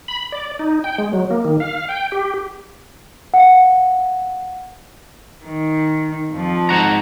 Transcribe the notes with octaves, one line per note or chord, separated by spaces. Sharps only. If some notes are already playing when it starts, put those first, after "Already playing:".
B5
D5
D#4
G5
G#3
F#3
A#3
D#3
F5
G5
G4
F5 F#5
D#3
F2 F3
G#2 F#4 A#5